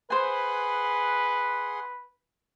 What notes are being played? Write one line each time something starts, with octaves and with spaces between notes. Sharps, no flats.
G#4 B4 C5 F#5 G#5 C6